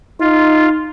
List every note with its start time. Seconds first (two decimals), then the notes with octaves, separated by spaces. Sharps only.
0.20 D#4 F4